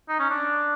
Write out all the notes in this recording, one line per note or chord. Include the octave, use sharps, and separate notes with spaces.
D#4
C#4
D4